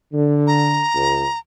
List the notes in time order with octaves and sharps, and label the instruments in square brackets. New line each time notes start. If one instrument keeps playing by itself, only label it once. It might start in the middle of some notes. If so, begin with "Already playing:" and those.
[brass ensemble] D3
[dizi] A#5
[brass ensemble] C#2